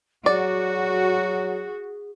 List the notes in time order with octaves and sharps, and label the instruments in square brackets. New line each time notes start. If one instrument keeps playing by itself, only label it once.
[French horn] F#3 [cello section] F#4 [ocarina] G#4 [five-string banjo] D5